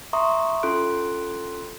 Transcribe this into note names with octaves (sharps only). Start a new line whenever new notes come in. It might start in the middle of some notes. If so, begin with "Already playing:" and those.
E5 A#5 C6 C#6 D#6
C#4 F4 A4 C6 F#6 D7